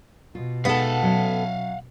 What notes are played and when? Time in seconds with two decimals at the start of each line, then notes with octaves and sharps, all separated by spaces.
0.35 B2 F4
0.65 G#3 B3 D#4 G#4 A4 F5 F#5
1.03 F#3 C#4